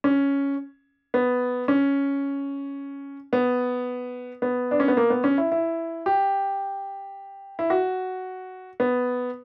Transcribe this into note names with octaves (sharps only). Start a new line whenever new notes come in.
C#4
B3
C#4
B3
B3
D4
C#4
B3
A#3
B3
C#4
E4
E4
G4
E4
F#4
B3